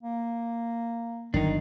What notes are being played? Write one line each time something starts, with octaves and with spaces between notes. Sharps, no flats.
A#3
G1 D#3 F#3 D4 D#4